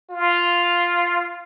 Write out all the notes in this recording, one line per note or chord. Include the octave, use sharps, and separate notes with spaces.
F4